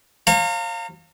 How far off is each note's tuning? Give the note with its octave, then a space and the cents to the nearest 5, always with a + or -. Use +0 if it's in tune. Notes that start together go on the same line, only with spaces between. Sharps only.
C#5 -45 F5 +0 A#5 -40